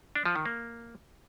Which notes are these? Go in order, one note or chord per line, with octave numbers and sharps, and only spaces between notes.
D4
F3
D#3
A#3